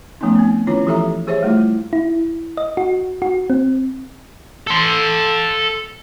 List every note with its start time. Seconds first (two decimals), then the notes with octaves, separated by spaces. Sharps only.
0.21 F3 A3 B3 C#4 D#4
0.35 B3 C4
0.67 D#3 C#4 E4 F4 C#5
0.86 E3 F3 G4 A4 E5 A#5
1.27 G4 G#4 C5 C#5 E5
1.43 G3 A3 E4 F4
1.93 E4
2.57 D#5
2.77 F#4
3.22 F#4
3.50 C4
4.67 A4 C6